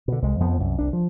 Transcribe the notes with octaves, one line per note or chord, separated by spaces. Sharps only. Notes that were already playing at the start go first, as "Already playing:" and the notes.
B2 D3
C2 G#3
F2 F3 B3
C2 F#2
C2 D4
F3